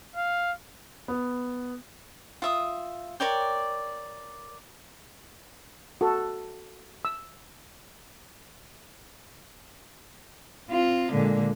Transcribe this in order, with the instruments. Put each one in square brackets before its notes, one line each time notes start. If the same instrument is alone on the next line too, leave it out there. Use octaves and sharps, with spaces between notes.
[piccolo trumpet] F5
[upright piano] B3
[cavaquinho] F4 E5 D#6
A#4 C#5 D5 G5
[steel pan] F#4 A4
E6
[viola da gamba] C4 F4
A#2 D3 G#3